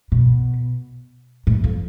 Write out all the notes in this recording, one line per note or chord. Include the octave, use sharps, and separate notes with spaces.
B2
A2
F2